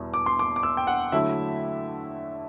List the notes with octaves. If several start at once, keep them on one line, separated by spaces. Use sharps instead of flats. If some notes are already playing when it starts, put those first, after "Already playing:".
Already playing: E2 B2 G3 B3 E4
D6
C6
D6
D6
E6
G5
F#5
D3 F#3 A3 E4 E5